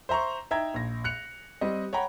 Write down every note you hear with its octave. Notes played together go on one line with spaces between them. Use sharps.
C5 E5 A#5 C6 C#6
D#4 E5 G5 A#5 G#6
A#1 A#6
F#6 C#7 F7
G3 C4 D#5
C#5 F#5 G5 A#5 B5